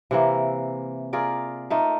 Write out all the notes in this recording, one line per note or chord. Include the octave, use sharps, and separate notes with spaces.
C3 E3 A#3
F4 G#4 A#4 D5
A3 A#3 D#4 F4